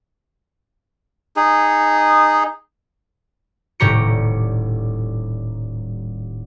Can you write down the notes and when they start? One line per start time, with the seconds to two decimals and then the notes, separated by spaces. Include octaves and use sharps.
1.36 D#4 G#4
3.80 D#1 A2 G3 G4 A#5 C#7